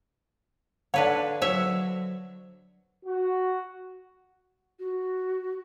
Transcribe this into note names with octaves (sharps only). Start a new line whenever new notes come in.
D3 D4 B4 C#5 F5
F#3 C5 C#5 E5
F#4
F#4